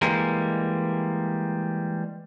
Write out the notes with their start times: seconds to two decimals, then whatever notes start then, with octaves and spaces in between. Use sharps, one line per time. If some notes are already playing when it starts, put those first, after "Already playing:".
0.02 E3 G3 G#3 A#3